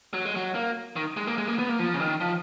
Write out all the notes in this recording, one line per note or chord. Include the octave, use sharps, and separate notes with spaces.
F#3
G#3
F#3
A#3
D#3
G#3
A#3
G#3
A#3
B3
A#3
F3
C#3
D#3
F3